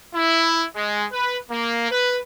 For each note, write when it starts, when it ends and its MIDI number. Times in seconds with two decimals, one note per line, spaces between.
0.15 0.64 64
0.76 1.05 56
1.12 1.37 71
1.51 1.88 58
1.91 2.18 71